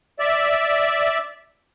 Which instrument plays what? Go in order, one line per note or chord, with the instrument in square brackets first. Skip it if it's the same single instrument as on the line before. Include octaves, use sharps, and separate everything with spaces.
[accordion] D5 E5